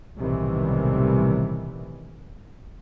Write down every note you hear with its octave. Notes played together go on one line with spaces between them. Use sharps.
B1 A2 C3 D#3 E3 G3